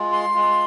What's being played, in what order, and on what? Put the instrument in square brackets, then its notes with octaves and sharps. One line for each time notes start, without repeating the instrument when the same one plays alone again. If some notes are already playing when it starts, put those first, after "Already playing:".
Already playing: [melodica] G#3 F4
C6
G#3 F4